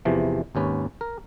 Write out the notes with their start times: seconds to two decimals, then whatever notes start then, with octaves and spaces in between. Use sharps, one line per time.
0.05 E2 C3 E3 F3
0.55 G#1 D#2 C#4 B4
1.01 A#4